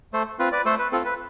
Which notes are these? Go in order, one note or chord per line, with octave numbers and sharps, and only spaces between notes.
A3 A4 C5
C4 F4 B4
B4 D5
A3 A4 C5
B4
C4 F4 A4
B4